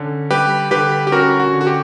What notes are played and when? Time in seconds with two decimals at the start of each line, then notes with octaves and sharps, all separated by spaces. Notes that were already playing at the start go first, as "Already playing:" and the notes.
Already playing: D3 C#4
0.31 G3 G4 B4
0.71 D3 G4 B4
1.07 G4
1.12 C#4 F#4 A#4
1.40 F#4
1.53 D3
1.61 F#4
1.67 G4